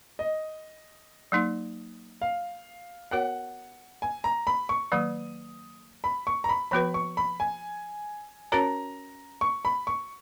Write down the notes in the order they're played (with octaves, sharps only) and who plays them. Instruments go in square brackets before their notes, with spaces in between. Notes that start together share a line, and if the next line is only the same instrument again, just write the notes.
[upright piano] D#5
[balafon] F#3 A#3 D#4
[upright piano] F5
[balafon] B3 F#4 A#4 C#5 [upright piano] F#5
[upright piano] G#5
A#5
B5
C#6
[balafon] D#3 F#3 A#3 [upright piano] D#6
[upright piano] B5
C#6
A#5
B5
[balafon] F3 B3 F#4 B4 [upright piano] B5
[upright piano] C#6
B5
G#5
[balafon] C#4 F#4 A#4 C#5 [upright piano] A#5
[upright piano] C#6
B5
C#6